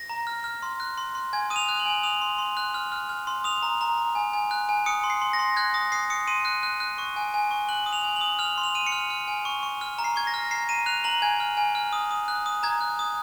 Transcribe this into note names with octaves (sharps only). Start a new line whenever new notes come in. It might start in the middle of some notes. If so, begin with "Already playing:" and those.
Already playing: A#6
A#5
F6
F6
C6
F#6
C6
C6
G#5 G#6
D#6 D#7
F7
F#6
F#7
G#5
D#6 F7
C6
C6
F#6
F6
F6
F6
C6
D#6 F7
A#5
A#5
A#5
G#5
G#5
F#6
G#5
D#6 C#7
C6
C7
C6
A#6
C6
F#6 G#6
D#6 A#6
D#6 C7
D#6 C#7
C6 D#7
F#6
F#6
F#6
C#6
G#5
G#5
C#6
F#6 F#7
D#6
F7
G#5
D#6 F#7
F6 F7
C6
F7
F6 D#7
C#7
F6
F6
G#5
C#6
C#6
F6
A#5
C7
C#6 G#6
A#6
F6
A#5 C7
A#5 D#7
F#6 F7
A#5 F#7
G#5 G#6
F6
G#5
F6
D#6
D#6
F#6
D#6
A#5 G#6
F#6
D#6